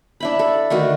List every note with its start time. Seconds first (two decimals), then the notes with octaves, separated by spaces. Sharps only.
0.20 D4 E4 B5
0.39 A4
0.70 D3 D#3 A3 F#4